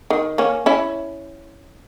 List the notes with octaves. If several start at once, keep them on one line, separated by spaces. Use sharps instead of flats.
D#3
A#3 C#4
C#4 E4